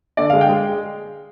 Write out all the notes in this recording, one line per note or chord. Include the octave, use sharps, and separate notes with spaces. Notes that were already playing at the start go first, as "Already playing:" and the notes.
D3 D5
G#3 F5
G5
G#3